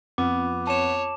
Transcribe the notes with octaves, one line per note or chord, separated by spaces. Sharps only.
F2 B3 D6
C#5 A5 D6 E7